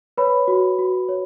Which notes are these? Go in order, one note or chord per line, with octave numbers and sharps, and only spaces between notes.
B4 C#5 B5
F#4
F#4
C#5